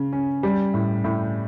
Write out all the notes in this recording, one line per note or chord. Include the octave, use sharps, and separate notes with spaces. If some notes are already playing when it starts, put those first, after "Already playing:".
Already playing: C#3
C#4
G3
A2
A2